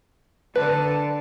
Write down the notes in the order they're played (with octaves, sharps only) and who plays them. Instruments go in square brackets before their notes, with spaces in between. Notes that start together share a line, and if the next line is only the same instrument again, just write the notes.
[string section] D3 [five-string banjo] B4 [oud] D5 [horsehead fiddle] A5